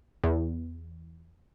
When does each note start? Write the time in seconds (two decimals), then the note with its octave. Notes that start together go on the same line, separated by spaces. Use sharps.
0.24 E2